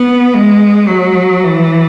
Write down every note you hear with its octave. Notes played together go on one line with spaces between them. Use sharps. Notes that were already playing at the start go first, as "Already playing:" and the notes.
Already playing: B3
G#3
F#3
E3